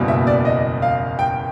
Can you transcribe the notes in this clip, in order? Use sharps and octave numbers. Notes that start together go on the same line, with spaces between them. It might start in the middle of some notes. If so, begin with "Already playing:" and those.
Already playing: F#1 E2 B2 G3 A#3
E5
D5
D#5
F5
G5